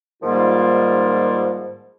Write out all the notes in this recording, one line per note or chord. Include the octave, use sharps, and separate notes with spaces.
G#2 D#3 F3 G3 A#3 F4